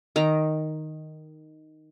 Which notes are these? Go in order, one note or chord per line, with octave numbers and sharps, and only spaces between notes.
D#3 A#5